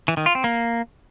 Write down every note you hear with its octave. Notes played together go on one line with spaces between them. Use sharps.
E3
D#3
F4
C4
A#3